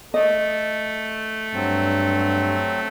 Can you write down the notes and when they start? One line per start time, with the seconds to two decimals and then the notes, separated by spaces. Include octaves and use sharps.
0.14 A3 D#5
1.54 G2 F#3 C4